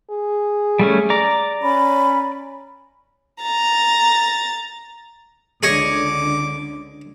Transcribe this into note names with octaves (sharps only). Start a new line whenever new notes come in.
G#4
G3 A3 C#4
D5 A#5 D6
C#4 B5
A#5 A6
C#2 D3 G#4 C#5 D#5 D6